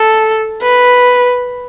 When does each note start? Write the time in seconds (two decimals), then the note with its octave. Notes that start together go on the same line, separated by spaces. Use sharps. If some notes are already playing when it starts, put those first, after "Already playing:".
Already playing: A4
0.62 B4